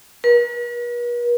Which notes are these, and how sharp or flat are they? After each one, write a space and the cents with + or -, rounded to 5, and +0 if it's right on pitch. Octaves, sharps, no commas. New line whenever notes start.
B4 -45